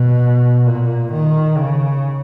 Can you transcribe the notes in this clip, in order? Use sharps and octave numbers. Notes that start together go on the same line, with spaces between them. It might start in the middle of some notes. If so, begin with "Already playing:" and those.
Already playing: B2
A#2
D#3
C#3